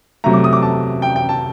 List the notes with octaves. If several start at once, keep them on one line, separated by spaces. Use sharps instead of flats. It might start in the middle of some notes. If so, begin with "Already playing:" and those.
C3 F#3 A3 A#5
D6
D#6
D6
A5
G5
G5
A5